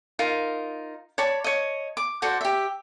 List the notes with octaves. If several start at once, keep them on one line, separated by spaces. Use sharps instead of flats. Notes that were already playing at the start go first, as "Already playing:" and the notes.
D#4 F4 A#4
C#5 D5 A5 B5
C#5 D#5
D6
F#4 A4 C5 D5
G4 E5